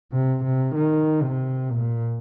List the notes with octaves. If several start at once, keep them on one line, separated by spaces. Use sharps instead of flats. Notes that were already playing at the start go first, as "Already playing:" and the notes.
C3
C3
D#3
C3
A#2